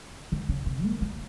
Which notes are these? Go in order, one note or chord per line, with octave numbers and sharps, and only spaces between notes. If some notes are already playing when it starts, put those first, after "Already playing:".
D#3
C#3
C3
A#3
A#3